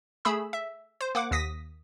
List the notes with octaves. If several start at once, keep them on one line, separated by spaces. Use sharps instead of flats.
A3 G#4 B5 E6
E5
C5
A#3 F#5 D6
D#2 D#6 A#6 B6